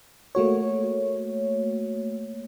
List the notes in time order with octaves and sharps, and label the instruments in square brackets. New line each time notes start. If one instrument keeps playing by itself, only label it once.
[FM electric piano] A3 A#3 F#4 C#5